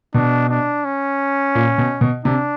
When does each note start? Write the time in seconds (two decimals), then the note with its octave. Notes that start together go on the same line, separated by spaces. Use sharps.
0.14 B2 D4
0.50 D4
0.84 C#4
1.55 A#2
1.78 B2
2.01 B2
2.25 C3 D4